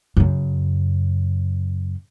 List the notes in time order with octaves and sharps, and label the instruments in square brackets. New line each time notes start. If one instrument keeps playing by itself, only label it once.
[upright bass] F#2 C#3